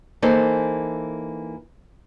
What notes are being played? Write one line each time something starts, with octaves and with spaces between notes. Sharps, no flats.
E3 A#3 D#4 A4 C5